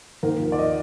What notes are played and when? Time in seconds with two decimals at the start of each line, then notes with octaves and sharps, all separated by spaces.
0.23 D#2 A#4
0.40 F3
0.52 D5
0.59 D#5